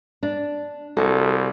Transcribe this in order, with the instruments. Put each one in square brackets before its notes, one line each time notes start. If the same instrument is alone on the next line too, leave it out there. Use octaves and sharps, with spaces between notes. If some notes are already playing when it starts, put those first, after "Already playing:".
[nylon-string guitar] D4
[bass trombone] C2 [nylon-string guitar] F#4 A4